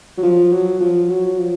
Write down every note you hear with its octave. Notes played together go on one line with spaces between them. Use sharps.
F#3
F3
F#3
F3
F#3
F3